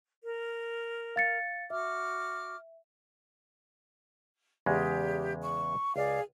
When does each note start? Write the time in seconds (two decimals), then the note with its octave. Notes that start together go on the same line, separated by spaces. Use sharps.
0.23 A#4
1.16 F5 A6 C#7
1.70 F#4 E5 D6 F6
4.66 E2 C#3 G#3 G4
5.41 C#6
5.96 C#2 G#4 D5 F5